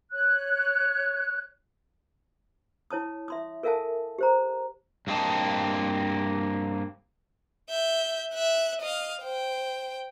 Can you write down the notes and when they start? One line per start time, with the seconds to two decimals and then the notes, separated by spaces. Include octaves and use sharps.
0.11 C#5 F#6
2.91 E4 C#5 A5 D#6
3.28 E5 C6 D#6
3.63 A4 A#4 E5 F5 G#5 A5
4.19 G4 C5 A#5
5.07 G2 A#3 C4 D#5 A5
7.70 E5 G6
8.33 E5 F#6
8.81 D#5 F5
9.22 C5 G5